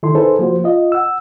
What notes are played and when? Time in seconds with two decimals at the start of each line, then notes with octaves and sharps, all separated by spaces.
0.03 D#3 E4 A4 C6
0.15 D#4 G#4 A4 B4 C5
0.39 F3 A#3 F#4 C5
0.64 F4 D#5
0.92 F#5 E6